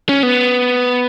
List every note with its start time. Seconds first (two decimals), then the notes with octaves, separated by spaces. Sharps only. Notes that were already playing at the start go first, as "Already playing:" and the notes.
0.09 C#4
0.23 B3